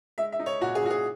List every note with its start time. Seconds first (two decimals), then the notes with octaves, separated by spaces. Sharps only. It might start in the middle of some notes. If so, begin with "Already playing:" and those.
0.18 G#3 E5
0.32 E5
0.39 D#4
0.46 C#5
0.61 A#2 F#4
0.75 G#4
0.82 A#2 F#4
0.90 G#4